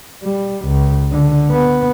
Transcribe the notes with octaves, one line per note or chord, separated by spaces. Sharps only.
G3
C#2
D3
B3